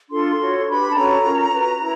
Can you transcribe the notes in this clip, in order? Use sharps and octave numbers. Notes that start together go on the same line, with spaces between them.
D4 F4 A4 C6
F#4 A4 C#5
D4 G4 B4 B5
A5
C#4 F#4 A4 C#5 A#5
C#4 F4 A#4
F#4 B4
E4